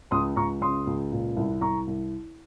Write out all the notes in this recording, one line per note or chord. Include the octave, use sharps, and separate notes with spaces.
C#2 C6 D#6
C#2 A#5 C#6
C#3 C6 D#6
C#2
A#2
C2
C2 A#5 C#6
C2